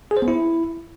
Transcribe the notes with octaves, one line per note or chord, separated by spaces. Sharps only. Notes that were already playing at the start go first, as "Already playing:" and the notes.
G#4
C5
B3
E4